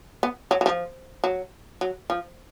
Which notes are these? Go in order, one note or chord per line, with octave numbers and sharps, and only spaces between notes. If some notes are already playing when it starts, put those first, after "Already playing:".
B3
F#3
F#3
F3
F#3
F#3
F3